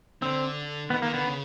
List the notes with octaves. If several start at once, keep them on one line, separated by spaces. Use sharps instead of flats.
D3 C4
D#3 B3
D#3 A#3
D3 B3
C#3